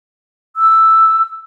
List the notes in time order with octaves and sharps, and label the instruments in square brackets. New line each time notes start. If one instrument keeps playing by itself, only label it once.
[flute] E6